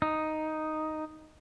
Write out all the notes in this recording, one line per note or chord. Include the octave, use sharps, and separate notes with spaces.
D#4